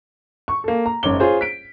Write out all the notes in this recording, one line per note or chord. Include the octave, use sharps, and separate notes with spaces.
C#6
A#3 A4
A#5
F#1 G#2 C#5 D6 G7
F4 G#4 C5 C#5
B6 D7